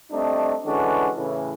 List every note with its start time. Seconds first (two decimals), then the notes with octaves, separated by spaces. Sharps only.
0.12 G3 A3 C4 D4 D#4
0.66 D3 E3 G#3 C#4 D4 F#4
1.17 A2 C#3 E3